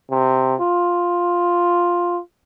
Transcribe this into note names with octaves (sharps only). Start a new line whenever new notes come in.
C3
F4